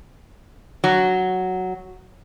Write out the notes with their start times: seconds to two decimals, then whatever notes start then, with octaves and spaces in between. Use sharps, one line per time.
0.84 F#3